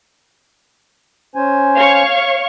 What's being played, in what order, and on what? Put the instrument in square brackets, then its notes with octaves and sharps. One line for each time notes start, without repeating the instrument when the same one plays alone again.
[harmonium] C#4 C5 G#5
[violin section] C#5 F5 C#6